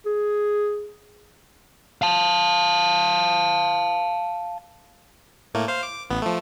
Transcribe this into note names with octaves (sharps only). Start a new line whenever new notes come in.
G#4
F5 A5
A2 A3 A#3
C5 F5
D6
A1 B3
F3 A3